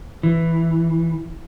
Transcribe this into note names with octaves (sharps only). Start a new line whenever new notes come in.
E3